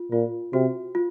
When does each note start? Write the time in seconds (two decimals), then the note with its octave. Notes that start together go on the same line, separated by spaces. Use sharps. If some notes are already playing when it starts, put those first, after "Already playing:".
Already playing: F4
0.12 A#2 F4
0.53 C3 F#4
0.95 F4